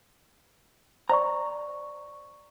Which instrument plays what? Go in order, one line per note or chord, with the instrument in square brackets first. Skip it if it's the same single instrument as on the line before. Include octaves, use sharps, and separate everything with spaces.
[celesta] C5 D5 C#6 [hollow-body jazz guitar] A#5